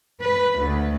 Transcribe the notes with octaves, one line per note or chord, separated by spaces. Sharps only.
B4
D2